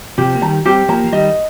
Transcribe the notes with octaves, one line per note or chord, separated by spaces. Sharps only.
C3 F3 G4
A#3
D#3 G3 A#5
G3 C4 G4
F3 A#3 A#5
F3
D#3 G3 D#5